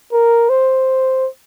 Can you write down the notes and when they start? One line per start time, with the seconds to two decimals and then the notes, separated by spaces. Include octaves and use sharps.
0.13 A#4
0.49 C5